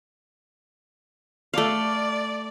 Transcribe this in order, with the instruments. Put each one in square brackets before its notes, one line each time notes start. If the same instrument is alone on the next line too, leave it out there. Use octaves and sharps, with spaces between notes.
[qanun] A3 F5 [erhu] D5